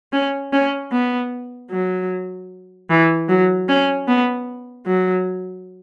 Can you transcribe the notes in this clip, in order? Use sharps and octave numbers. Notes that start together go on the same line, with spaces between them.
C#4
C#4
B3
F#3
E3
F#3
C#4
B3
F#3